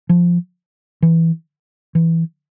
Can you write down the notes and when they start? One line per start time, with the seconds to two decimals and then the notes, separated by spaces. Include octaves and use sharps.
0.09 F3
1.02 E3
1.95 E3